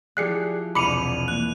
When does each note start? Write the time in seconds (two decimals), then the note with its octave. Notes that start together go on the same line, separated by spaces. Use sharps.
0.17 F3 E4 G4 G#4 D5 F#6 C7 C#7
0.75 E1 C2 B5 D6 C#7 D#7 F7 F#7
1.28 E3 A#3 F#6